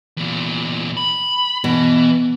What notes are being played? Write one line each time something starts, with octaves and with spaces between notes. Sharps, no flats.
E2 A#2
B5
B2 E3